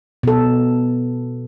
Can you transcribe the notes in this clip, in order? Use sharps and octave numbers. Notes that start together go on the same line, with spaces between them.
B2 A4